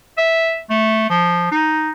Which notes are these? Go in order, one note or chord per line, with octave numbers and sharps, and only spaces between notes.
E5
A3
F3
D#4